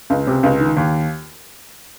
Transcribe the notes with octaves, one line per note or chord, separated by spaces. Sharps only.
C#2
C3
C#2
D#3
D#2